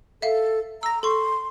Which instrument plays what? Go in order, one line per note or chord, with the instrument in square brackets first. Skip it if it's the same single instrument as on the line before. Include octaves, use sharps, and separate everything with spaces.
[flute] A4 [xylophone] E5 F5
[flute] A#5 [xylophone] E6 A#6
[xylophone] A4 C#6 [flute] C6